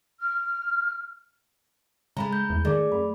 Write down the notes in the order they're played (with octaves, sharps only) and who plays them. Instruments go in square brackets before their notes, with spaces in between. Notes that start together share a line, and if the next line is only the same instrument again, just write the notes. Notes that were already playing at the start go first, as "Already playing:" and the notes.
[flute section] F6
[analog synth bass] C#3 [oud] G#3 A3 [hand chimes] A#5 B5
[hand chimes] G6
[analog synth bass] E2
[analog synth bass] D#3 [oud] A3 [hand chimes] G#4 D5 D6
[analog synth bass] F#2 [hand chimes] B5